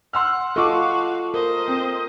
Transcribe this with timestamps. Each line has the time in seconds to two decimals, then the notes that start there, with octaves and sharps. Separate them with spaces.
0.13 F#5 C6 E6 F6
0.56 F4 F#4 A4 D#5 F5 C#6 D6
1.34 A#4 C5 D#5
1.68 C4